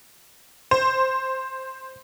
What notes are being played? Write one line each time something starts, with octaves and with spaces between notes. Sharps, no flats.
C5